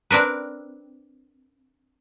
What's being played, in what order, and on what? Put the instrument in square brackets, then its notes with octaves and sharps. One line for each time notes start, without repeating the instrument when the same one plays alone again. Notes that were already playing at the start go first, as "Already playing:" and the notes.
[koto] C4 D4 A#4 B4